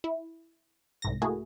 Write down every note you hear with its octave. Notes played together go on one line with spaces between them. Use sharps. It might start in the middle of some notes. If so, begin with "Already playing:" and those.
E4
C2 G#2 A#6
A3 A#3 E4 F#4 G#4